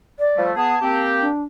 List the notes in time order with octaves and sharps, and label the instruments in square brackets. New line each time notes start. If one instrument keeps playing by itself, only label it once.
[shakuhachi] D5
[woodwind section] F3 G3 A3
[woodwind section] B3 G#4 [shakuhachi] A5
[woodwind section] A#3 C4 G4
[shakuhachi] D4